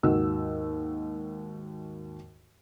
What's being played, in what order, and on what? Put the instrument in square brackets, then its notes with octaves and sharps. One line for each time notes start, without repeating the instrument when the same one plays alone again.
[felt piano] D#2 G#2 F#4 E6